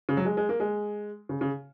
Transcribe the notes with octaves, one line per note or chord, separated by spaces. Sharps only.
C#3
F#3
G#3
G#3
A#3
G#3
C#3
C#3